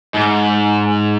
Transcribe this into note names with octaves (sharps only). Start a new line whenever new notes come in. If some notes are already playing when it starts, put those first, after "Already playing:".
G#2